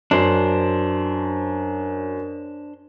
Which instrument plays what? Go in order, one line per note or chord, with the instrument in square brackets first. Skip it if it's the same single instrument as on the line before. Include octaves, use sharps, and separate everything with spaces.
[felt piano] F#2 [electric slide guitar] D4 C5